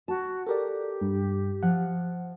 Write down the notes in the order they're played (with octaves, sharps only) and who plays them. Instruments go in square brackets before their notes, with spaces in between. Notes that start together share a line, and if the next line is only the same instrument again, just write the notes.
[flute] F#4 [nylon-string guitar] A5
[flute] G4 [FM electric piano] A4 A#4 D5
[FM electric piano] G2
[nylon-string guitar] F3 [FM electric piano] F#5